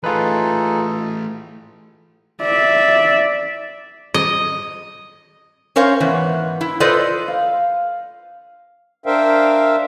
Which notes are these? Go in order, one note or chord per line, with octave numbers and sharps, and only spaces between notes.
E3 A3 D#4 F4 G#4 A4 B4
D5 E5
D#5
C#4 A#4 C5 C#5 F5
G#2 E3 B3
E4
F4 A4 B4 C5 D5 D#5
F5
D4 A#4 C5 E5 F5 G5